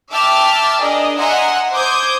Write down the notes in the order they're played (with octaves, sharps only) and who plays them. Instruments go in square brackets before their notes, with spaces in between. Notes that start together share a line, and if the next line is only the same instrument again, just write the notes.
[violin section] E5 G5 A5 D6 F6 A6
D4 G#4 A#4 D5 D#5
D#5 E5 F#5 G#5 A#5 C6
C5 D6 D#6 G6 G#6